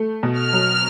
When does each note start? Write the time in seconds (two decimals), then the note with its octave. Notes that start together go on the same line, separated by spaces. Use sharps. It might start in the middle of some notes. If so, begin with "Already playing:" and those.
Already playing: A3
0.23 B2
0.38 F6
0.53 F#3